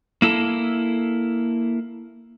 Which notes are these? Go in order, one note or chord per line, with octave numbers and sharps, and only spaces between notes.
A#3 E4 A4